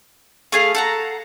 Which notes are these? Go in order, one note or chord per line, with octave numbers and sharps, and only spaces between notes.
A3 G#4 F5
A4 F#5 A#5